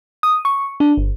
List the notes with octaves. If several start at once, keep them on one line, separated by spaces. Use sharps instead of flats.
D#6
C#6
D4
G1